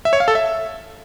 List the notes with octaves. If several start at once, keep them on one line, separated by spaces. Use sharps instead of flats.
E5
C#5
F5
A4
E5